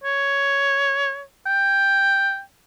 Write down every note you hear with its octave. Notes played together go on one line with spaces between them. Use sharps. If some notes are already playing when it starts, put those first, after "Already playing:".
C#5
G5